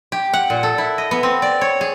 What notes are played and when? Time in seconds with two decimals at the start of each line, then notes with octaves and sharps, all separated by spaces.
0.12 G4
0.33 F#5
0.50 A#2
0.63 A4
0.78 E4
0.98 D#5
1.11 B3
1.23 C4
1.42 D5
1.61 C#5
1.81 G#4